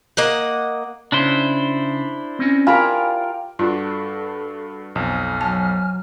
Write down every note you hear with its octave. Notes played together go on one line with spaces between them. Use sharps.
A#3 D#5 F#5
C#3 D4 E4 C5
C4 C#4
F4 G4 A#4 G#5 B5
G2 D4 F4 F#4 A4
B1 F2 G#5 F6
F#3 A5